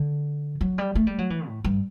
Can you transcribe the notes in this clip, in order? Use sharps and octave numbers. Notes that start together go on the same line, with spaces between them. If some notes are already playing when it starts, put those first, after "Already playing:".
Already playing: D3
F#3
G3
A3
G3
F#3
E3
A2
G2